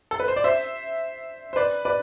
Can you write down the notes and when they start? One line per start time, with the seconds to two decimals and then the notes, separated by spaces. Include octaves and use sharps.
0.11 A4
0.20 B4
0.28 C5
0.36 D5
0.44 C5 E5
1.53 C5
1.56 B4 D5
1.85 B4 D5